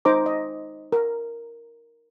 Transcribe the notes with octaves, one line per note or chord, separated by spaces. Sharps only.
D#4 C5 A#5 D6
D#5
A#4